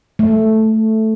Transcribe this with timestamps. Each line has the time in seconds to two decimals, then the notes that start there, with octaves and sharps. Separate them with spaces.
0.19 A3